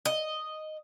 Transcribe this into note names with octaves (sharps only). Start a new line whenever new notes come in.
D#5